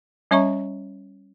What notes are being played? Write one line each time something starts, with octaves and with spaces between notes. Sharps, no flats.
G3 C#4 C#5 E5 A#5 C#6